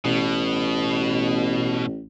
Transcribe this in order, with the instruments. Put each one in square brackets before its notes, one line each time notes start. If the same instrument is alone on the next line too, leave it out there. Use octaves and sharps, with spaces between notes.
[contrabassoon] A1 [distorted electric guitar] B2